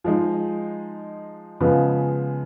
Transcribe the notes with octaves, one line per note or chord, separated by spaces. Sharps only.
F3 G#3 D#4
C#3 F3 G#3 B3